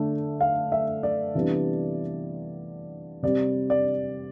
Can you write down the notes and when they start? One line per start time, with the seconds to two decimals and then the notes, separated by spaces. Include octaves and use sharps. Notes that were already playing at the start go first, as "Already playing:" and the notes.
Already playing: D3 A3 D4
0.41 F5
0.72 E5
1.03 D5
1.35 C3 E3 G3 B3 D4
3.23 C3 G3 C4 D5
3.70 D5